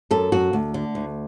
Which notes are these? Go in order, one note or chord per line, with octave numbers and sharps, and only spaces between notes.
F#2 A4
F#2 F#4
D2
D3
D2